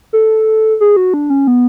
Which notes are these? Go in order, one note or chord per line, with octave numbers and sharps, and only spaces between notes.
A4
G#4
F#4
D4
C#4
B3